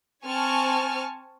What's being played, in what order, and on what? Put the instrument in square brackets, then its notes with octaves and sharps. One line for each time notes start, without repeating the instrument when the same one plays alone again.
[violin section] C4 G#5 A5 C#6 F6